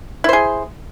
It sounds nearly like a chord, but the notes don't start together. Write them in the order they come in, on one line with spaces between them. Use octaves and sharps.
E4 C5 G#4